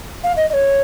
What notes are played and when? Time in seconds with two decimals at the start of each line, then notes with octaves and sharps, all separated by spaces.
0.24 F5
0.37 D#5
0.50 D#5
0.53 C#5